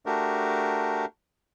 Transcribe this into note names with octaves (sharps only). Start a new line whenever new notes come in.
A3 D4 F#4 G4 A#4